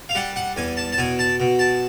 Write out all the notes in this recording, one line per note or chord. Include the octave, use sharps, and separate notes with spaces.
F5
G3 F#5
F#5
E2 G#5
A5
A5
B2 G#5
A5
B2
A5